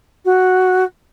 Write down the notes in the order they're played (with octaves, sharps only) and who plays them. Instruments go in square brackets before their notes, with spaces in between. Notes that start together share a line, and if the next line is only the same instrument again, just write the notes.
[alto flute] F#4